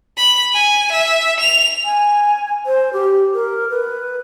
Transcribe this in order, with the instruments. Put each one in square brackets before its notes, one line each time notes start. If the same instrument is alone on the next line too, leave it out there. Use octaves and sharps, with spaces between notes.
[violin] B5
G#5
E5
F7
[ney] G#5
C5
G4
A#4
B4